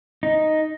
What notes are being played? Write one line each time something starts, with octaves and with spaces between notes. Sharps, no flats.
D#4